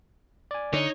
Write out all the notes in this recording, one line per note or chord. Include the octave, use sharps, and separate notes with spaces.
D5 G#5
D3 D#4 C#5